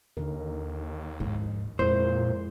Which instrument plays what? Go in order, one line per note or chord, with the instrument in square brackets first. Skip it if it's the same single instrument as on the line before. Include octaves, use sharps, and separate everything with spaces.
[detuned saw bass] D#2 [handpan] D3 D#4 A#4
[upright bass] G#2 F3
[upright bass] F2 [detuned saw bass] A#2 [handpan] G#3 E4 A#4 [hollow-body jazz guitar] C5